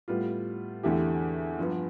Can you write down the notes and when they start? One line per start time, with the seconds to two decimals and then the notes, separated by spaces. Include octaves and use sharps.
0.08 A2 G3 B3 F4
0.83 E2 D3 A3 E4 G4
1.58 G2 F3 B3